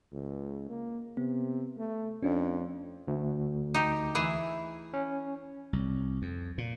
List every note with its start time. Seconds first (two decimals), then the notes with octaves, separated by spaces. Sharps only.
0.12 C#2
0.69 A#3
1.17 C3 B3
1.77 A3
2.23 F2 C#4 D4
3.08 D2
3.74 D#4 G4
4.15 E3 E4 G#4
4.94 C#4
5.73 C2
6.22 F2
6.58 A#2